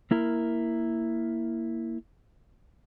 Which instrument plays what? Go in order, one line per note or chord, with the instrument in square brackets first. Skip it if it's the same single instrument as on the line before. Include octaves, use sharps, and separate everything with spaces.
[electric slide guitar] A#3 E4 A#4